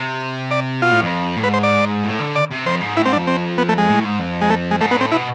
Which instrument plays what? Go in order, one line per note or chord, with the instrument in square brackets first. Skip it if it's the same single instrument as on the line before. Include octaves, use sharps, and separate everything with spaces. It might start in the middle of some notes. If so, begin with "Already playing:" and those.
Already playing: [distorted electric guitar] C3
[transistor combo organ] D5
[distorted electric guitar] B2 [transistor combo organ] F4
[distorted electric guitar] A2
F2
A2
[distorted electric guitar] G#2 [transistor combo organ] B4
[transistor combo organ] C5
D5
[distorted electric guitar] A2
D3
[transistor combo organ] D5
[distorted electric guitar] C3
[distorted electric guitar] F2 [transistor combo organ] C5
[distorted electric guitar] G#2
[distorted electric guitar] A2 [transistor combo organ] E4
[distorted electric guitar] G#2 [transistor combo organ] C4
[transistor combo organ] D4
[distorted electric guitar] F2
[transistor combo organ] C4
B3
A3
G#3
[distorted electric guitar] A2
G#2
F2
[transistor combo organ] G#3
A3
G#3
[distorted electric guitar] G#2 [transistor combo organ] A3
[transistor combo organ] B3
[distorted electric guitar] A2 [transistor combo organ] C4
[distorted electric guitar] B2 [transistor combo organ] E4